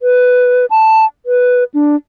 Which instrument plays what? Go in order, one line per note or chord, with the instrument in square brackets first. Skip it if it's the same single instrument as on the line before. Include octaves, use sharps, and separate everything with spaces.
[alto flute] B4
A5
B4
D4